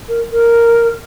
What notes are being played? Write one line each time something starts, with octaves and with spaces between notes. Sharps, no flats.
A#4
A#4